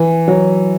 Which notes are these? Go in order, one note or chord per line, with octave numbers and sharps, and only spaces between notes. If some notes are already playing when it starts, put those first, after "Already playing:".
Already playing: E3
F#3